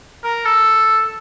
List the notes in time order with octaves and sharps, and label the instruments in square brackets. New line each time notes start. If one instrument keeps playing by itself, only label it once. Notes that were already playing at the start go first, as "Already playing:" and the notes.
[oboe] A#4
A4